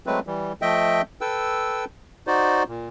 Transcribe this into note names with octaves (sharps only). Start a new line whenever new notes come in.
F#3 G#3 A3 C4 B4
E3 G3
F3 A3 D#5 E5 G5
A4 B4 G5 E6
D#4 F#4 C5 D5
A#2